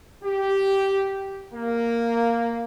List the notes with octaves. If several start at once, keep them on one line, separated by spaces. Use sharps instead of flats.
G4
A#3